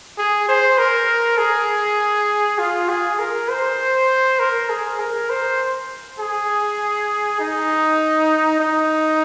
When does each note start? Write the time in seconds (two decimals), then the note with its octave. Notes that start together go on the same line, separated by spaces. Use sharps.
0.18 G#4
0.49 C5
0.78 A#4
1.38 G#4
2.59 F4
2.89 G#4
3.19 A#4
3.49 C5
4.40 A#4
4.69 G#4
4.99 A#4
5.30 C5
6.19 G#4
7.40 D#4
8.60 D#4